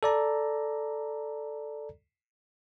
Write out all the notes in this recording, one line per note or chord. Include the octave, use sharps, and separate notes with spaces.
A4 D5 A#5